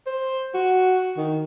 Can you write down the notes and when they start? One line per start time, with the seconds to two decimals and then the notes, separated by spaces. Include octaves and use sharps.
0.06 C5
0.54 F#4
1.17 D#3